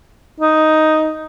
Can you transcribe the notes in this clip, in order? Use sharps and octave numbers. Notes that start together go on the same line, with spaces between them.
D#4